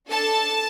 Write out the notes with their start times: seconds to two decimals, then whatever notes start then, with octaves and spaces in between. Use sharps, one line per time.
0.10 D4 A4 A5